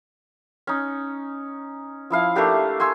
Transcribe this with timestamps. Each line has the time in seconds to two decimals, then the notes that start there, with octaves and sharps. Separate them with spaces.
0.67 C#4 D#4
2.10 F3 E4 F5
2.36 A3 A#3 D4 G4
2.80 G#5 C6 C#6 E6